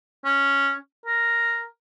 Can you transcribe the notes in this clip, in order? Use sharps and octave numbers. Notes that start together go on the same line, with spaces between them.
C#4
A#4